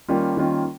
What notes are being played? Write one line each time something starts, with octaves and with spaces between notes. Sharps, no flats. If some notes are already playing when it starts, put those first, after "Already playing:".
D#3 G3 A#3 C#4 F4
D#3 G3 A#3 C#4 F4